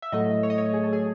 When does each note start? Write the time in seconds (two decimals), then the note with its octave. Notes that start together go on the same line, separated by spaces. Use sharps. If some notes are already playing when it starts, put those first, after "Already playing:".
0.02 E5
0.12 A2 F#3 A3 D#5
0.43 C#5
0.50 D#5
0.58 C#5
0.74 G#4
0.83 A4
0.93 G#4